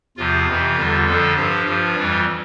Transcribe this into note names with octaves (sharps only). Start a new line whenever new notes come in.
E2 C3 F3 F4
F2 C3 E3
E2 D3 G3
F2 D3 F3 A4
G2 F3 G4
G2 F3 F4
F2 E3 G3